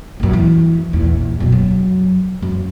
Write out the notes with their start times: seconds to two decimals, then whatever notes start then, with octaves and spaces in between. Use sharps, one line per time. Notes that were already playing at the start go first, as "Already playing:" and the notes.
0.20 A#1 F#2
0.33 E3
0.93 A#1 E2
1.40 F#2 B2
1.52 F#3
2.42 F#2